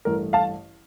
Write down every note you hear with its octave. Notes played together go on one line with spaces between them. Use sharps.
A1 G2 E3 A3 A#4
F5 A5